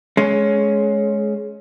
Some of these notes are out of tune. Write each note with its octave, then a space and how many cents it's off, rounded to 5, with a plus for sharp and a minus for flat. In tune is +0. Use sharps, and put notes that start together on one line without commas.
G#3 +20 C#4 +5